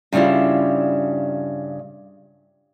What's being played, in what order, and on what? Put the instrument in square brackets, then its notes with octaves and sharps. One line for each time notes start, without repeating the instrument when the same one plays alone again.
[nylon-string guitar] G2 C#3 G3 E4 F4